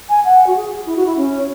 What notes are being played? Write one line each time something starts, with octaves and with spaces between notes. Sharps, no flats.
G#5
F#5
F#4
G#4
E4
F#4
E4
C#4